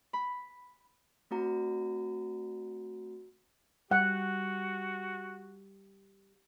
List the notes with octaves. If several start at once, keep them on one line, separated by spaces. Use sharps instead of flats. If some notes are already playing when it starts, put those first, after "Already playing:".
B5
A3 C4 F#4 A#5
G3 F#4 F#5